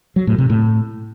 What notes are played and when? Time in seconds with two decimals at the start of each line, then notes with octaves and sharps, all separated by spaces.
0.16 F#3
0.27 A2
0.38 C3
0.50 A2